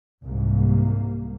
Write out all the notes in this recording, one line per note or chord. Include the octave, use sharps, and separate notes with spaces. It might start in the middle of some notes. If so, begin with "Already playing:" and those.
C2 G#2 A#3